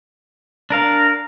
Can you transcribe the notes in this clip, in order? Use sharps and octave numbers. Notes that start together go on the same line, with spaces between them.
D4 A#4 F5